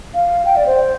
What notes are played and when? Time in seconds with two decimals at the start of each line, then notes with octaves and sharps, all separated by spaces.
0.14 F5
0.45 G5
0.56 D5
0.66 C5